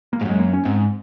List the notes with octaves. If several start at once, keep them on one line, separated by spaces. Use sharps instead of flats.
A#3
G#2
F#2 G#3
A#3
C#4
G#2 C4